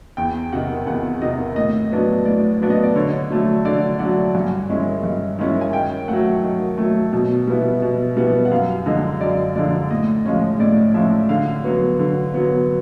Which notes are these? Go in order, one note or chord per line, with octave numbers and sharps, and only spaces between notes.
E2 G5
C3 D#3 F#5
E2 F#5
C3 D#3 D#5
A2 D#5
F#3 B3 D4
A2 D5
F#3 B3 D4
D#5
D5
D3 C#5
F#3 A3 D4
D3 D5
F#3 A3 D4 F#5
G2 G#5
D#3 G#3 C#4 E4
G2
D#3 G#3 C#4 E4
G#5
D#3 G5
F#3 A3 F#5
D#3
F#3 A3
B2
G3 B3 E4
B2
G3 B3 E4
F#5
F#2 F5
D3 F3 G#3 D#5
F#2 D5
D3 F3 G#3 D5
A2 D#5
F3 G#3 C#4
A2 D5
F3 G#3 C#4 E5
D3 F5
F#3 B3
D3
F#3 B3